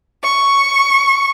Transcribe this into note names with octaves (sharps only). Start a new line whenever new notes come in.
C#6